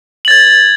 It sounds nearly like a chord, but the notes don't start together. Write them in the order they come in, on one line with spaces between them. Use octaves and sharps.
F#7 A6 G#6